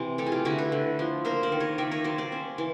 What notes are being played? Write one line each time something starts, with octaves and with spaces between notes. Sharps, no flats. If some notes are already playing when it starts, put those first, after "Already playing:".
Already playing: C3 E3 C4
A3 G4 A4
G#4
F4 G4
D3 E4 F#4
A4 B4
D3
F3
A#3 A#4 C5
C5 D5
D#3
C#5 D#5
D#3 D5 E5
C#5 D#5
F#3 C5 D5
C5 D5
C#4
E3